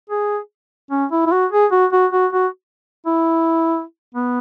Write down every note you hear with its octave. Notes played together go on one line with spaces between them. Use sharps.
G#4
C#4
E4
E4
F#4
G#4
F#4
F#4
F#4
F#4
E4
B3